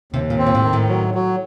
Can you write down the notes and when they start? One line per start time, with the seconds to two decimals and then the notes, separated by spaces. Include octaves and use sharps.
0.12 D#2 C3
0.30 A#2
0.38 C4
0.46 A#2
0.55 A2
0.64 D#3
0.73 A2
0.89 F#3
1.14 F#3